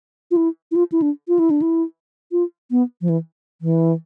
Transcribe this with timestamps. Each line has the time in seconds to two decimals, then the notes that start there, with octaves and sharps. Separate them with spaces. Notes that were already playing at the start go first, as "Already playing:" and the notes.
0.31 F4
0.37 E4
0.71 E4
0.76 F4
0.92 E4
1.02 D4
1.28 F4
1.39 E4
1.50 D4
1.62 E4
2.32 F4
2.71 B3
3.01 F3
3.09 E3
3.61 E3